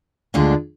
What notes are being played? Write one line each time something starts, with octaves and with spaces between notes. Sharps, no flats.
D2 D3 G#3 D4 F4